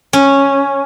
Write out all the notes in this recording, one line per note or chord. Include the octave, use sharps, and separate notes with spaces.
C#4